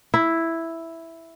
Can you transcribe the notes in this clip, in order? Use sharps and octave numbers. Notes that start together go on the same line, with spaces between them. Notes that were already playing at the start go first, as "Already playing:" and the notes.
E4